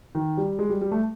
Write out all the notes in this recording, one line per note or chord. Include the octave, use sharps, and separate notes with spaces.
D#3
G3
G#3
G3
G3
A3